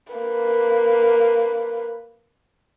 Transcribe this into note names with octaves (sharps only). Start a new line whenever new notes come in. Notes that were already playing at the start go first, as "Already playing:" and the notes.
A#3 B4